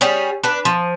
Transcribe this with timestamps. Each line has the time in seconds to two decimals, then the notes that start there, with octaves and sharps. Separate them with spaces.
0.01 G3 C#4 G#4
0.43 D4 B4
0.65 F3